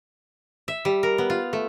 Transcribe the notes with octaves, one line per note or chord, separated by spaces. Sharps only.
E5
G3
A#4
B3
F4
A3